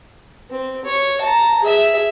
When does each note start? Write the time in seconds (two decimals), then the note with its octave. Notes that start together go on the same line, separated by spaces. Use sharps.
0.50 C4
0.85 C#5
1.21 A5 A#5
1.60 G#4 E5